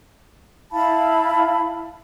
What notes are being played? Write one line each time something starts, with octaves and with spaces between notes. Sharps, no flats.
E4 F5 A5 B5